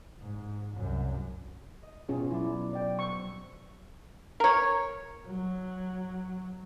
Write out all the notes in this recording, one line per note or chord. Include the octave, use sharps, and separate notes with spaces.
G#2
C2 F#2
D#5
B2 C#4 F4 G#4
F#3 D4 E4
D5 G5
C5 C#6 E6
A#4 C#5
F#3